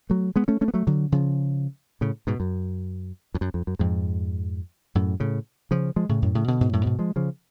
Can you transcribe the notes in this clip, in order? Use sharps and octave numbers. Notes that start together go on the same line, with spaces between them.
F#3 A3
G#3 B3
A3 C#4
A3 C#4
B3
F#3 A3
D3 F#3
C#3 F3
A2 C#3
G#2 B2
F#2
F2
F#2
F2
F#2
F2 G#2
F#2 A2
A2 C#3
C#3 F3
F3 G#3
A2 C#3
F#2 A2
A2 C#3
B2 D3
G#2 B2
F#2 A2
G#2 B2
F3 G#3
C#3 F3